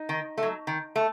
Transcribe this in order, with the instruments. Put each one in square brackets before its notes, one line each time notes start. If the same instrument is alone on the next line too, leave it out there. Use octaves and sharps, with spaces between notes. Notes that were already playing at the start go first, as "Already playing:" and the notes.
Already playing: [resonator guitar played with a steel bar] D#4
D#3
A3
F#3
D#3
A3